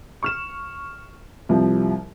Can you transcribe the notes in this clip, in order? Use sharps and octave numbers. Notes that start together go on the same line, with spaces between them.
C#6 F6 E7
C2 F3 G3